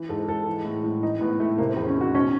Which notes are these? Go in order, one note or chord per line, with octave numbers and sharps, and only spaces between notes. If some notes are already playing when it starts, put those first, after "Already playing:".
Already playing: E3
G#2 A4
G#2 A4
E3
A2
A2
E3 D#4
A2 B3
A2 A3
C3 A#3
C4
E2
C#4
D#3 F#4
B2 C#4